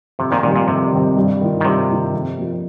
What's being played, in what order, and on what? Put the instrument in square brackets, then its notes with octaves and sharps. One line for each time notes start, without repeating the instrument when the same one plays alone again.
[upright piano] F2 [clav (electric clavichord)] C3
[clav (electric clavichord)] A#2 D#3
[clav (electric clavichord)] A#2 [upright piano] D#3 G3 C4
[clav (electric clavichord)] A#2
[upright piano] F2 [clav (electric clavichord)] C3
[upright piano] D#3 G3 C4
G2
D#3 A#3 F4
[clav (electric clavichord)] D#3
[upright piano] G2 [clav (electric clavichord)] C3
[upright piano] D#3 A#3 F4
F2
F3 A#3